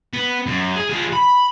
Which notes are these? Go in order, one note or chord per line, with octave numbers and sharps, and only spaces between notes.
B3
F#2
G#4
F3 G#4
B5